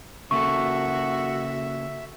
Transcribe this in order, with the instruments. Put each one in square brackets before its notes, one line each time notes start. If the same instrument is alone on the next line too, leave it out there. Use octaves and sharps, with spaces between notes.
[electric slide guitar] C#3 A#3 A4 [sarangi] F#4 [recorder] E5 [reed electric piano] C#6